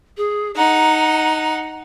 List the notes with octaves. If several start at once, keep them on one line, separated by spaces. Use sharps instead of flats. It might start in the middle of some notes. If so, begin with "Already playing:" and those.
G#4
D#4 F#5 A#5